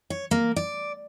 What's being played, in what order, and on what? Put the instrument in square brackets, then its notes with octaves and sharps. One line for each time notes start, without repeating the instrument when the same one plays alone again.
[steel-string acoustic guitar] C#5
A#3
D5